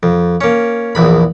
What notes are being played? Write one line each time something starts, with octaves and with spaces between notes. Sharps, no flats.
F2
A#3 C#4
A#1 E2 B5